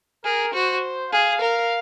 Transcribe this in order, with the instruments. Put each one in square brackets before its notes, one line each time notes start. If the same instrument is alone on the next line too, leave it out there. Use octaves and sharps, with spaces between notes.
[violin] G#4 [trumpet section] A#4
[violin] F#4 [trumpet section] C5
[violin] G#4 [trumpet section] F5
[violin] A#4